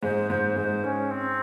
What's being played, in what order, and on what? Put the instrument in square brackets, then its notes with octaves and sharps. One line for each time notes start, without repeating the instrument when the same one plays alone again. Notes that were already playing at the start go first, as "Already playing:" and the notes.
[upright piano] G#2 G#3 [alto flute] C5
[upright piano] G#2 G#3 [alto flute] C5
[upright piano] G#2 G#3 [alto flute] C5
[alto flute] C#4
C4